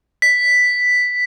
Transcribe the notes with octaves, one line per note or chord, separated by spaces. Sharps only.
B6